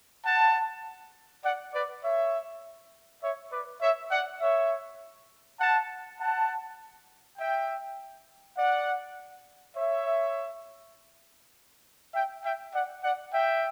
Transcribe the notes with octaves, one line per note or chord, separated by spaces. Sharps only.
F#5 A5
D5 F#5
B4 D5
C#5 E5
C#5 E5
B4 D5
C#5 E5
D5 F#5
C#5 E5
F#5 A5
F#5 A5
E5 G5
D5 F#5
C#5 E5
E5 G5
E5 G5
D5 F#5
D5 F#5
E5 G5